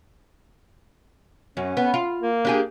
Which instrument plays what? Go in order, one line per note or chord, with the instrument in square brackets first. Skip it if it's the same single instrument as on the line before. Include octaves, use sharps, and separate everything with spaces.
[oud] F#2 [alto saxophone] C#4
[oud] B3
F4
[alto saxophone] A#3
[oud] D4 G4 G#4